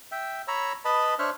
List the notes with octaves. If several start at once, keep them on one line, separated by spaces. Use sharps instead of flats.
E5 G5
C#5 A#5 B5 E6
B4 D#5 A5 B5
D4 C5 C#5 E5 F6 F#6